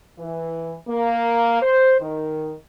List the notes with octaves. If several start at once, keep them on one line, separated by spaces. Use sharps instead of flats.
E3
A#3
C5
D#3